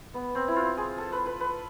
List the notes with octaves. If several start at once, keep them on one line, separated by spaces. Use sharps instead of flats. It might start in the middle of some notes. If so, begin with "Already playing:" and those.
B3
C4
E4
F4
G#4
A4
B4
B4
B4